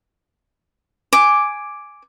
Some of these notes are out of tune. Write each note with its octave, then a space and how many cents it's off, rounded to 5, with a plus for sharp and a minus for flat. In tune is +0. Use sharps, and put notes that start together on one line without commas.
G#5 +0 D6 +0